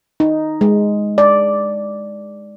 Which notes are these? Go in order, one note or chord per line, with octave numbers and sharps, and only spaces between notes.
D#4
G#3
D5